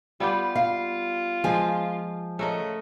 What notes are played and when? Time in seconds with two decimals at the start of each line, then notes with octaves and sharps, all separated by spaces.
0.20 G3 B3 F4 G4
0.56 F4 F5
1.44 F3 G#3 G#5
2.39 C#3 A3 A#4 D#5